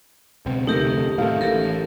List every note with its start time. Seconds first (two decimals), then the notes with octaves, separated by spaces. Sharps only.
0.46 C#2 B2 C4
0.67 F1 D2 C3 A3 D#4 G4 A#4
1.18 A2 D#3 A3 F5
1.41 A1 A2 E3 G4 A4 A#4